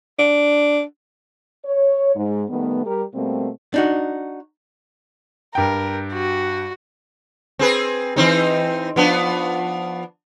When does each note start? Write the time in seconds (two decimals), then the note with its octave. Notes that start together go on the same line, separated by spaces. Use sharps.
0.19 D4
1.65 C#5
2.16 G#2
2.49 D#3 G3 A3 B3
2.85 G3 G4 A#4
3.14 B2 G3 A3 A#3 C4
3.74 D4 D#4 F#4
5.55 G2 A#4 G5
6.13 F#4
7.59 C4 G#4 B4
8.16 E3 C4 D#4
8.96 F3 B3 D4